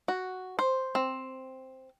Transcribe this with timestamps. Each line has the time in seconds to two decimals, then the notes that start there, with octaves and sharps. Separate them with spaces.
0.08 F#4
0.59 C5
0.95 C4